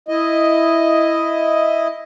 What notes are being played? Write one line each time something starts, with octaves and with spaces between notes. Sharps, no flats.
E4 D#5